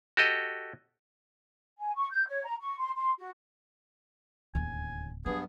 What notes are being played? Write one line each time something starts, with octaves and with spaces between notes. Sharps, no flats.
F#4 G4 A4 D#5
G#5
C#6
G6
C#5
A#5
C#6
C6
C6
F#4
D1 D#2 C#3 G#5
G2 F#3 B3 G#4